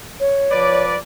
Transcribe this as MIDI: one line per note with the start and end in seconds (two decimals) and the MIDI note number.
0.20 0.83 73
0.51 0.96 53
0.51 0.96 71
0.51 0.96 74